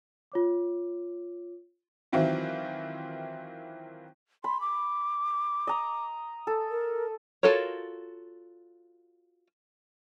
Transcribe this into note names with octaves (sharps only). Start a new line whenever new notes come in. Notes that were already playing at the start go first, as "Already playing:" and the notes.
F4 C#5 D6
D#3 E3 F#3 C4 E4 F4
B5 C6
D6
D#5 A#5 D#6
A4
A#4
F4 F#4 A4 A#4 C#5